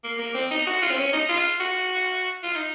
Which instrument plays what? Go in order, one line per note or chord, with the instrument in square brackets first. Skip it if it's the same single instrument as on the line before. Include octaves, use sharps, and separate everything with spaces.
[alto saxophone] A#3
A#3
C4
D#4
F#4
F4
C4
C#4
D#4
F4
F#4
F4
D#4